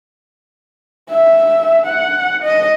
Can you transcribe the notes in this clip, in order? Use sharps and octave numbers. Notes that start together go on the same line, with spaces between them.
E5
F#5
D#5